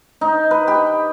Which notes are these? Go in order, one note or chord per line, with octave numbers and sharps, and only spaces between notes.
D#4
B4
G4